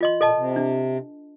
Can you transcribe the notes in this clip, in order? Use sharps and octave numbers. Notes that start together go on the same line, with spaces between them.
F4 D#5 C6
A#2 A4 D#5 A5
C3
D4